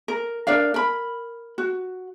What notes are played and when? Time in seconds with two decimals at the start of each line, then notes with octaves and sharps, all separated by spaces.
0.08 A#4
0.47 D4 A#4 D5 F5
0.74 A#4 B5
1.58 F#4